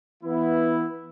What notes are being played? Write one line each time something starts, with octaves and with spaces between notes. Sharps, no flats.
E3 B3 E4